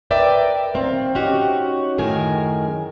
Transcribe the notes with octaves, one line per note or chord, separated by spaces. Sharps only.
A#4 B4 D5 E5 G5
D#3 C4 F5
C#4 D#4 F#4 G4
F#2 A2 D#3 G#4 A#4 G#5